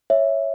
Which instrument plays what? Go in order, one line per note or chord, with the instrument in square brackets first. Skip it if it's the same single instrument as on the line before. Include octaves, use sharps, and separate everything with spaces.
[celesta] C#5 E5